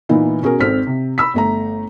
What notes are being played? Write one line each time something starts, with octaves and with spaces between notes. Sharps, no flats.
A#2 E3 B3 D#4 F4
B2 C#4 F#4 G#4 A#4
G#1 G#2 C4 A4 F6 B6
C3
B5 E6 B6
G1 A3 A#5